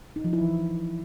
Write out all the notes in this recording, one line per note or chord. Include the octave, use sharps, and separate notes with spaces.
D#4
F3
E4
E3